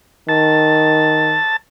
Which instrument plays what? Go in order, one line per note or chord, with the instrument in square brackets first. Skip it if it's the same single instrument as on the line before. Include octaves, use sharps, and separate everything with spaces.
[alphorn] D#3 [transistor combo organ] A5